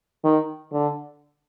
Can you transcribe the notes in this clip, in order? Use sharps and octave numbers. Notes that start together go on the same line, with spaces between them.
D#3
D3